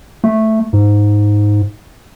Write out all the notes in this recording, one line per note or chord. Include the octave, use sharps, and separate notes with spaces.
A3
G#2